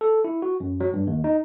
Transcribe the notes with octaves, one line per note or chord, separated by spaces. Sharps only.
A4
E4
F#4
F#2
F#3
G2
D#2
D#4